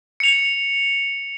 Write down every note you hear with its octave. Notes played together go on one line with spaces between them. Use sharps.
C#7 F7